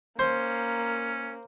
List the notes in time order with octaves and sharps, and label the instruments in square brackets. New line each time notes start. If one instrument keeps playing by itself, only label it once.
[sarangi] A#3 [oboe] C#4 [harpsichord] C5